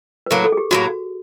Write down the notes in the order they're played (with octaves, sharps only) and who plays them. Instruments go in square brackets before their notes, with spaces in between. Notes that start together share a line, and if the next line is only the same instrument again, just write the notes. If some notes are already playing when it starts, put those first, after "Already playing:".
[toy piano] B4
[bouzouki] A2 F#3 A#3 [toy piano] A#4
[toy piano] A4
G#4
G4
[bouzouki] A2 F#3 A#3 [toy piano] F#4